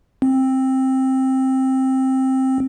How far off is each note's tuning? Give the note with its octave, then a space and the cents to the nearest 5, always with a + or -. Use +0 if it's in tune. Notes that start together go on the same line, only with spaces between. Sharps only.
C4 +10